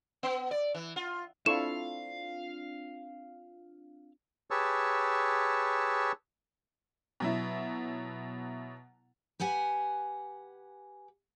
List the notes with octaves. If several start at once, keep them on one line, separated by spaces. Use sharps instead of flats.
B3
D5
E3
F4
C4 D4 E4 F4 A4 F5 C#6 E7
G4 G#4 B4 C#5 A5 E6
B2 F#3 E4
G4 B4 F#5 G#5